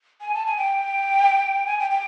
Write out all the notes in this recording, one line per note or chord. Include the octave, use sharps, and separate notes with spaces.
G#5
A5
G#5
G5
G#5
G5
G5